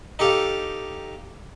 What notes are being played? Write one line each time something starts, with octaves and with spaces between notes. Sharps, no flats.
D#4 G4 A4 F5